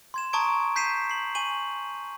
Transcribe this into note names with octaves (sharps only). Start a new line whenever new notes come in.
C6 G#6 E7
A5 A#5 C#6 D#6 G#6 D7
G6 B6 C7 D#7 E7
C7 F#7
G#5 C#6 D#7 F#7